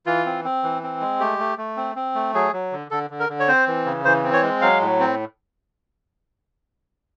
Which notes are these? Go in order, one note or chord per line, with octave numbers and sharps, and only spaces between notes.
E3 F4
C4
C4
E3
C4
G#3
A3 G4
A3
A3
C4
C4
A3
F#3 G#4
F#3
D3
D3 A4
D3
A#4
D3
C#5
C4 C5
E3
C#3
E3 C5
C4
C#5
G#3
F#3 F5
A2
C4